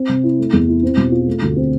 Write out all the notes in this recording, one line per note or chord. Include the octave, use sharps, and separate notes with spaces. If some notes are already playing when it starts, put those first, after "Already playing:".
Already playing: C4
C3
E4
A3
E2
E4
C4
B2
F4
A3
D2
C4